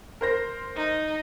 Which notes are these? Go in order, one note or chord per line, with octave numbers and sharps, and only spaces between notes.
A#4 C5 A#6
D#4